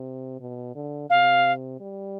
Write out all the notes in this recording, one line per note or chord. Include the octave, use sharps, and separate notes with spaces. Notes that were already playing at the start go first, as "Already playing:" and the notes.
Already playing: C3
B2
D3
C3 F5
G3